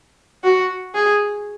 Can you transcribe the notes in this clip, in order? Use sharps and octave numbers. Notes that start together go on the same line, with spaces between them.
F#4
G#4